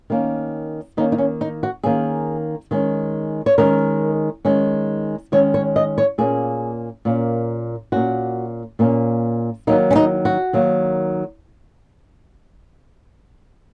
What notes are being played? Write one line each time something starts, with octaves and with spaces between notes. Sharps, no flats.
D#3 A#3 C#4
D#3 A#3 C#4 D#4
D#4
C#4
D#4
F#4
D#3 A#3 C#4 G#4
D#3 G#3 C#4
C#5
D#3 G#3 C#4 A#4
D#3 G#3 C#4
D#3 G#3 C#4 C#5
C#5
D#5
C#5
A#2 A#3 C#4 G#4
A#2 A#3 C#4
A#2 A#3 C#4 F#4
A#2 A#3 C#4
D#3 F#3 A#3 D#4
C#4
D#4
F#4
D#3 F#3 A#3